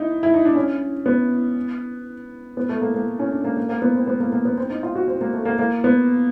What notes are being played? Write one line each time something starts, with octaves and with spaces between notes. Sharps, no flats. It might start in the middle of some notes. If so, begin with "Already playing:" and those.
Already playing: D#4 E4
E4
D#4
D4
C#4
B3
B3
A3
A#3
A#3
C#4
D4
A#3
A#3
A#3
B3
C4
B3
A#3
A#3
B3
C4
D#4
F4
F#4
C4
A#3
A3
A#3
A#3
B3